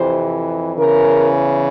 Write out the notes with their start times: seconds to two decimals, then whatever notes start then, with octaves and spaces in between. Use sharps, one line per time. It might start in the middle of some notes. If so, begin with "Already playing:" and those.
Already playing: F2 C3 E3 C5
0.76 E2 C#3 E3 A#4